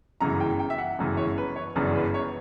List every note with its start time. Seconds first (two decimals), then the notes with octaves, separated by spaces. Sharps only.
0.21 G1 F#2 C#3 E3 A#5
0.40 G5
0.59 G5
0.70 E5
0.78 F#5
0.99 G1 F#2 C#3 E3
1.17 C#5
1.38 B4
1.56 C#5
1.76 G1 F#2 C#3 E3 D5
1.95 B4
2.14 C#5